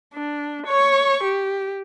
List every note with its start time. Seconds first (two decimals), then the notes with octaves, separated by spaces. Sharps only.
0.14 D4
0.67 C#5 C#6
1.24 G4